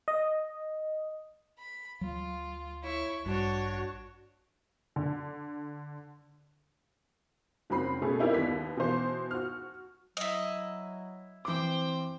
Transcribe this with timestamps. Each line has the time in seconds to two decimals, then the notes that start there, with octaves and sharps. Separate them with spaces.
0.08 D#5
1.59 B5
2.01 D2 F#3 F4
2.84 E4 C#5 C#6
3.26 A1 G2 D4 F#4 C#5
4.96 D3
7.70 F#1 F#3 C4 B5 C7
8.02 B2 A3 C#4 G#4 A4
8.19 C4 D#4 E4 G4 A#4 D5
8.34 D#2 B3 B6
8.77 B2 E3 C5
9.31 F#4 F6
10.17 F#3 E4 D#5
11.45 E3 C4 C5 G5 D6